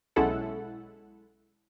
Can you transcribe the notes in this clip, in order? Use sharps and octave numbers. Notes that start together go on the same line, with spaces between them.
B1 G#3 C#4 E4 A4 F#5